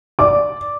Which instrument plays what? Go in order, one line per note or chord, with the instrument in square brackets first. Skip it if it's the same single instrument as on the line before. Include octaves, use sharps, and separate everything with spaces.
[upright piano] D5 D6